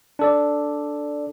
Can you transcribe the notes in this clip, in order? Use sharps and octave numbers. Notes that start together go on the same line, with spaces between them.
D4 A4 D5